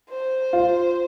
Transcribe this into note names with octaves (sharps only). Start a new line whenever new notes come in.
C5
F4